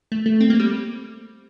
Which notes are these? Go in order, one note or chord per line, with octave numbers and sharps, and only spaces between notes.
A3
A3
C4
A#3
G3